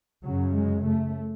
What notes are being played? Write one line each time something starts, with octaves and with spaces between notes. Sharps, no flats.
F#2 C#3 F#3
G#3
A3